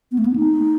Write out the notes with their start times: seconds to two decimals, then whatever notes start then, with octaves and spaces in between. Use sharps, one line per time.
0.12 B3
0.19 A3
0.26 B3
0.36 D#4